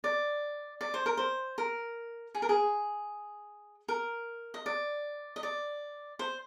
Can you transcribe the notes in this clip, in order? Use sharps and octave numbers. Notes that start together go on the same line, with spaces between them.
D5
D5
C5
A#4
C5
A#4
G#4
A#4
G#4
A#4
D#5
D5
D#5
D5
C5